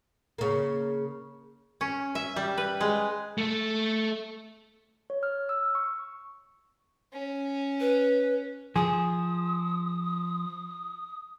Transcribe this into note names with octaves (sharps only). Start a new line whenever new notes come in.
C#3 A#3
C#4
E5
G3
B4
G#3
A3 A4
C#5
F6
E6
C#6
C#4
B4
F3 G#4 D#6